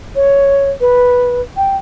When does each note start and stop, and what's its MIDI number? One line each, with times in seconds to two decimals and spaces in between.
0.16 0.71 73
0.81 1.41 71
1.57 1.77 79